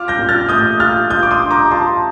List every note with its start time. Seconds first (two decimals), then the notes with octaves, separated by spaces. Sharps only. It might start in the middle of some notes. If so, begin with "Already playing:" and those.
Already playing: F4 D6 F6
0.08 G6 A#6
0.19 A#2
0.29 F6 A6
0.49 A3 D#6 G6
0.80 F4 F6 A6
1.10 F4 D#6 G6
1.23 D6
1.31 C6 D#6
1.40 D4
1.50 A#5 D6
1.71 F4 A5 C6